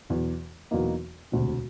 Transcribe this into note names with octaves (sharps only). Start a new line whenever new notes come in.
E2 B2 F#3
E2 B2 F#3 A#3 D#4
E1 D2 C3